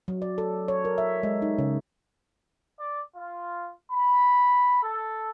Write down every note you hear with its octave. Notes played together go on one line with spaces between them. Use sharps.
F#3
D5
A4
C#5
A#4
E5
G#3
D#4
C#3
D5
F4
B5
A4